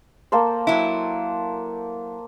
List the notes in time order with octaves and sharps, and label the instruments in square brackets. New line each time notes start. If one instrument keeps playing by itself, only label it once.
[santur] A#3 A4 C5
[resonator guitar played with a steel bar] F#3 E4